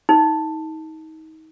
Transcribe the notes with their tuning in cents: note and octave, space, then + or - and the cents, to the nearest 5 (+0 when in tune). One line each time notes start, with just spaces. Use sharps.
D#4 +30